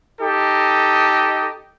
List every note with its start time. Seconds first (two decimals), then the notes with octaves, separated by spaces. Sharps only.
0.21 D#4 G4 A4 D#5